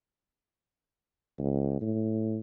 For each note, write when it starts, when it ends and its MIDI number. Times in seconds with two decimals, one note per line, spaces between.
1.38 1.79 37
1.81 2.40 45